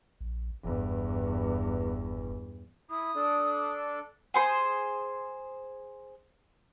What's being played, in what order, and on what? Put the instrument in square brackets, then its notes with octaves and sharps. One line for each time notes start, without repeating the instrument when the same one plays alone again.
[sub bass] A#1
[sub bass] F#1 [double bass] E2 G2
[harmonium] E4 [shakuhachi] D#6
[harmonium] D4 A4 D5
[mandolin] G#4 C5 C6